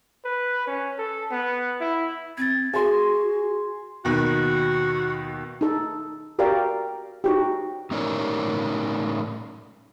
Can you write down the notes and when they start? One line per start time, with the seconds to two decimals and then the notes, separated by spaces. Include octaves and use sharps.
0.25 B4
0.67 C#4
0.98 A4
1.31 B3
1.81 E4
2.37 C4 G#6 A6
2.73 F#4 G#4 G#5 C6
4.05 D#2 B2 D#3 F#4
5.61 D#4 A4
6.39 F#4 G4 A#4 D5 F5
7.24 D#4 F#4 G4
7.91 A2 C#4 D#4 A#4 C#5 D5